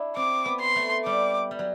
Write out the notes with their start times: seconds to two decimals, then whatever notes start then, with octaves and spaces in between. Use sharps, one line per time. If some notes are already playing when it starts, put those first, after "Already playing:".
Already playing: D4 E4
0.16 C4 D6
0.46 B3
0.61 C6
0.76 A3
1.05 G3 D6
1.51 G3
1.59 F#3